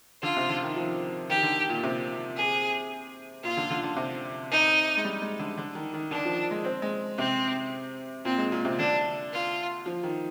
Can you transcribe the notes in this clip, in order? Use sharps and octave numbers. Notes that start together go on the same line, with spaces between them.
D3 F4
C3
D3
D#3
F3
D#3 G4
D3
A#2
C3
G#4
A#2 F4
D3
D3
D3
C3
D#4
G#3
G3
G#3
D3
D3
D#3
D#3
D3 D4
F3
G#3
C4
G#3
C3 C4
A#2 C4
G#3
A#2
C3
D3 D4
F4
F3
D#3